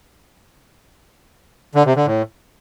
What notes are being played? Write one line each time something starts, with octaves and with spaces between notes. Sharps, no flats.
D3
C3
D3
A2